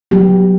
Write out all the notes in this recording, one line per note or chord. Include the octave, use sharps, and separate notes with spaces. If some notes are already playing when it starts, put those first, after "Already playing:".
F#3 B3 G4